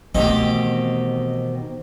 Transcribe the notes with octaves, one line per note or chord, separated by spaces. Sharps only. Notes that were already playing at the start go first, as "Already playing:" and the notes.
B2 D#3 E3 A3 C4 D#4 G4